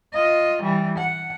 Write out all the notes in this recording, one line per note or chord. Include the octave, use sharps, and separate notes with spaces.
F4 D#5
E3 G3
F#5